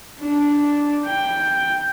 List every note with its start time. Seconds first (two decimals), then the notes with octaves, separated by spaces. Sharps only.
0.20 D4
1.06 G5